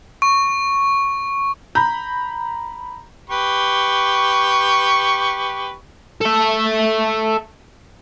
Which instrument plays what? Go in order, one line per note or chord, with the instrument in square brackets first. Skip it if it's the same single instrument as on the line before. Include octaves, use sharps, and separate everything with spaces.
[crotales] C#6
[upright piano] A#5 B5 G6
[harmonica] G4 B4 C#6
[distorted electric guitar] A4 E5